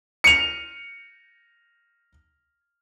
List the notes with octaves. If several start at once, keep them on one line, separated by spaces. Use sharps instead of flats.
C#7 D#7 F7